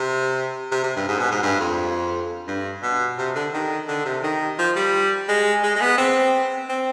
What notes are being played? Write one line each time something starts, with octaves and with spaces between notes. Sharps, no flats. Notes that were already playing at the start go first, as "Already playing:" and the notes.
Already playing: C3
C3
C3
G2
G#2
B2
G#2
G2
F2
G2
B2
C3
D3
D#3
D3
C3
D#3
F3
G3
G#3
G#3
G#3
B3
C4
C4